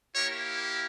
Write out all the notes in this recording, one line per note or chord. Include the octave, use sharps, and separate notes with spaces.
A#3 E4 G4 A#4 C#5